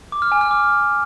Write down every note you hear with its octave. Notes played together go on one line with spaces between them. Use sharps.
D6
F6
G#5
F6
D6